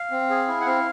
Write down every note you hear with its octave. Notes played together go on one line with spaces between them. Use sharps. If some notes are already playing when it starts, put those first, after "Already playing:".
Already playing: F5
C4
G#4
E4
F#5
C4 F5